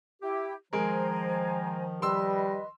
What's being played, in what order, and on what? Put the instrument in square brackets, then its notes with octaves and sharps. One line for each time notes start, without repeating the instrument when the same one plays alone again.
[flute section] E4 G5 [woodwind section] G4
[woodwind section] D#3 F3 [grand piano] G#3 A#4 [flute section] C5 G#5 A#5
[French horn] G3 [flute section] B4 D#5 [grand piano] C6 E6